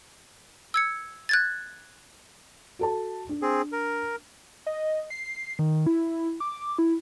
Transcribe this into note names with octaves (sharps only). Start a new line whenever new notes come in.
E6 G#6 C#7
F#6 G#6 A6
F#4 A4 A5
D4
C4 G#4
A#4
D#5
C7
D#3
E4
D6
E4